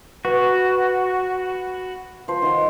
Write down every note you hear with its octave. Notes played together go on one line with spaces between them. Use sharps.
F#4 B4
F3 C5
D#3 F#5